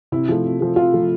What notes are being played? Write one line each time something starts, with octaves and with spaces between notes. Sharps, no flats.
C3 E4
F3 A3
C3
F3 A3
C3 F4
F3 A3